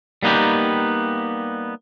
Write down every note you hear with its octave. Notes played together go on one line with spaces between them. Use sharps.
G3 A#3 B3 D#4 G4